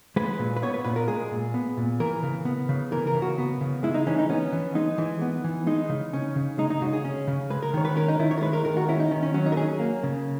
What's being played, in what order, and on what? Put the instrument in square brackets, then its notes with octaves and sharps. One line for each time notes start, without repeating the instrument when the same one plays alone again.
[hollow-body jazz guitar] G#3 B4
A#2
B4
B3 C#5
B4
A#2 B4
A#4
G#3 G#4
A#2
B3
A#2
E3 A#4
C#3
B3
C#3
E3 A#4
A#4
C#3
F#4
B3
C#3
G#3 E4
D#4
E3 C#4
D#4
B3 C#4
E3
G#3 D#4
E3
B3
E3
G#3 D#4
C#3
C#4
C#3
G#3 D#4
D#4
C#3 F#4
G#4
C#4
C#3
G#3 B4
A#4
D#3 C#5
B4
C#4 A#4
D#4
D#3 E4
C#5
A#4
G#3 B4
A#4
D#3 A#4
F#4
C#4 E4
D#4
D#3 C#4
C#4
F#3 C#4
D#4
A#4
C#4 G#4
A#3
C#3